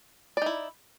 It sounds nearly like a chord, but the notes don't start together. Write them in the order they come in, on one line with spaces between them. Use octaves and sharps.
D5 D#4 E4